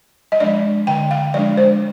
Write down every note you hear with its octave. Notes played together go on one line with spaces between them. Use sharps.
D#5
F3 G#3 D4 D5
D3 G5
F5
F3 G#3 D4 D5
C5